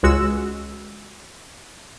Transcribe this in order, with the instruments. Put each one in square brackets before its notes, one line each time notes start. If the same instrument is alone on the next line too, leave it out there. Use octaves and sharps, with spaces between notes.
[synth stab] C#2 G#3 F#4 E6